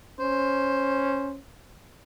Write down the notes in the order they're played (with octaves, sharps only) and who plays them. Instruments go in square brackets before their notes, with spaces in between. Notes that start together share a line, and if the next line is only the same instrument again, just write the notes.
[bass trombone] C#4 [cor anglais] C5